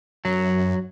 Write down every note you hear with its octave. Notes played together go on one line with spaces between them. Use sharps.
F#2 F#3